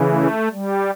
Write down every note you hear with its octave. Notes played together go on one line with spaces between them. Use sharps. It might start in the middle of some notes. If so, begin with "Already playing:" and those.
Already playing: C#3 E3
A3
G3